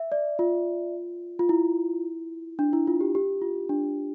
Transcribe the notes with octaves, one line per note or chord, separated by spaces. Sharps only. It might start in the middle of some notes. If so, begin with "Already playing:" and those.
Already playing: E5
D5
F4
F4
E4
D4
E4
F4
G4
G4
F4
D4